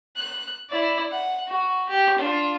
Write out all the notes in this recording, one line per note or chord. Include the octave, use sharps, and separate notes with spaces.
F#6
E4 D5
F#5
F#4
G4
D4 F4